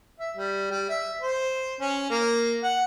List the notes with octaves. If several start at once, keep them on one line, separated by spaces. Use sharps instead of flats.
E5
G3
G3
E5
C5
C#4
A#3
F#5